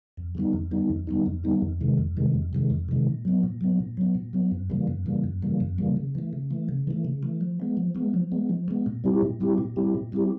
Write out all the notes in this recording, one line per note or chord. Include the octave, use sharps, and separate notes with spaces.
F2
D3 G3 B3 D#4
F2
D3 G3 B3 D#4
F2
D3 G3 B3 D#4
F2
D3 G3 B3 D#4
F2
C3 D#3 G#3
F2
C3 D#3 G#3
F2
C3 D#3 G#3
F2
C3 D#3 G#3
A#2
F#3 B3
A#2
F#3 B3
A#2
F#3 B3
A#2
F#3 B3
F#2
C#3 E3 G3 A#3
F#2
C#3 E3 G3 A#3
F#2
C#3 E3 G3 A#3
F#2
C#3 E3 G3 A#3
C#3
E3 A3
C#3
E3 A3
C#3
E3 A3
C#3
E3 A3
F3
G#3 B3
F3
G#3 B3
F3
G#3 B3
F3
G#3 B3
A#2
G3 C4 E4 G4
A#2
G3 C4 E4 G4
A#2
G3 C4 E4 G4
A#2
G3 C4 E4 G4